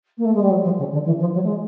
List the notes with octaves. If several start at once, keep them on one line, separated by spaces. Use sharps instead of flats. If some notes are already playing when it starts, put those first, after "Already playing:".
A#3
A3
G#3
G3
F#3
F3
C#3
D3
E3
F3
F#3
A3
G#3